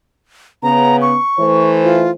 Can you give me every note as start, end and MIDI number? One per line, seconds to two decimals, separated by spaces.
0.63 1.14 49
0.63 1.14 59
0.63 0.97 82
1.02 1.70 85
1.39 2.14 52
1.39 2.14 57
1.39 2.14 72
1.83 2.11 65